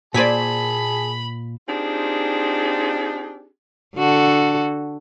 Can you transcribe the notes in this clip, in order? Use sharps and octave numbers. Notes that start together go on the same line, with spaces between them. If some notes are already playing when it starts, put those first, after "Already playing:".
A#2 G#4 C5 D5 G#5 A5 B5 B6
C4 D4 D#4 F4 G4 G#4
D3 F#4 A4